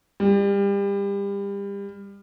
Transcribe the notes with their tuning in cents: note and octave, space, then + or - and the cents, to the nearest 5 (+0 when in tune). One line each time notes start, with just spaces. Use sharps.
G3 +30